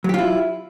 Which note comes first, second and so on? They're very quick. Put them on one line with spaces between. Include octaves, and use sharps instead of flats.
F#3 G4 F4 E4